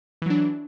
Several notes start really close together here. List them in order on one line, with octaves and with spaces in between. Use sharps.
E3 F#3 D4